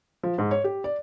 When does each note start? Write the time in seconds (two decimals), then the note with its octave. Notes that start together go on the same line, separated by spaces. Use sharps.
0.24 F3
0.38 G#2
0.51 C#5
0.64 G4
0.84 D5